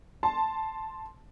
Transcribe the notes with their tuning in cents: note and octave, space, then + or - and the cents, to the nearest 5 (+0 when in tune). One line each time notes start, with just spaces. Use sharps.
A5 +0 C6 +0